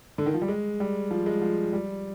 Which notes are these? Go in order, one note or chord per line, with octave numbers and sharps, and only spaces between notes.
D3
D#3
F3
G3
G#3
G3
F3
G#3
F3
G3